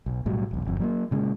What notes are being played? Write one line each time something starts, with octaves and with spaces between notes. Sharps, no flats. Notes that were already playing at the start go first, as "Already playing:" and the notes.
B1
B1 A2 F#3 G3
E1 B1
G1 F2
F#3 G#3 A#3
A#2 C#3 G#3